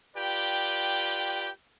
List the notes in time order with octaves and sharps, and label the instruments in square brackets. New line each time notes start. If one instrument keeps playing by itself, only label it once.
[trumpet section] F4 G4 B4 D5 G5